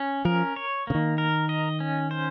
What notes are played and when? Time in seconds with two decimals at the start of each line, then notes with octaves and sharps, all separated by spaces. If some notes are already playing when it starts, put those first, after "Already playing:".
Already playing: C#4
0.25 F3 A#4
0.56 C#5
0.87 C#3 A#3
0.95 D#3
1.18 A#4
1.49 D#5
1.80 C#4
2.11 C5